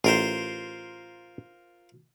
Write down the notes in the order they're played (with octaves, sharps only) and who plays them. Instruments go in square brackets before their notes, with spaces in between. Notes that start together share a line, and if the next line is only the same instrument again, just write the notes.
[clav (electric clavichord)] A1 [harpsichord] F4 A#4 C5